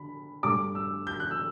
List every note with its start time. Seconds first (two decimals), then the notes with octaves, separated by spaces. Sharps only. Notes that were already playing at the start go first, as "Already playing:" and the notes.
Already playing: D3 B5
0.43 G2 D3 A3 D6
0.75 E6
1.07 G6
1.20 F#6
1.31 E6